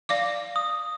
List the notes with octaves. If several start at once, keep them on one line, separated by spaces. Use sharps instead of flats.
D5 F5 D6
D#6